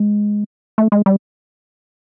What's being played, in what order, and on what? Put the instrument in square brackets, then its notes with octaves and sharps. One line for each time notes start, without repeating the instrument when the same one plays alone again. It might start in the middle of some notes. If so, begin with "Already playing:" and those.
Already playing: [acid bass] G#3
A3
G#3
G3